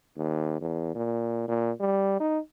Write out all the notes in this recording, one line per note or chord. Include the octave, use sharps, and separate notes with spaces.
D#2
E2
A#2
A#2
G3
D#4